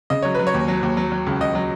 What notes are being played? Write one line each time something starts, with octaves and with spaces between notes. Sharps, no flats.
C#3 D#5
F#3 C#5
F#3 B4
C#5
D#2
F#3
D#2
F#3
F#3
C#2
C#2 D#5
F#3